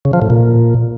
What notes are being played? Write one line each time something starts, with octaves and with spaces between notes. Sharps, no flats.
C#3
F3
A2
A#2